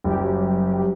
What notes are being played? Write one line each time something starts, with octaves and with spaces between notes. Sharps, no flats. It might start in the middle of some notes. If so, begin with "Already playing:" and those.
F#1 F#3 G3 G4